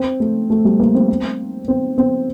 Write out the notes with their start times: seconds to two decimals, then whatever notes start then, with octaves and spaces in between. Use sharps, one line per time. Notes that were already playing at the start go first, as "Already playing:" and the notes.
Already playing: C4
0.20 A3
0.50 A3
0.65 G3
0.80 A#3
0.95 C4
1.68 C4
1.98 C4